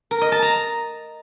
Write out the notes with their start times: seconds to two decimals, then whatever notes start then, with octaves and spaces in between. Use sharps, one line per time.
0.11 A#4
0.21 D#5
0.32 A5
0.42 A#5